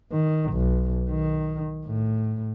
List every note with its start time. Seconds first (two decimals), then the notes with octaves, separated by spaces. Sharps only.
0.11 D#3
0.53 B1
1.10 D#3
1.86 A2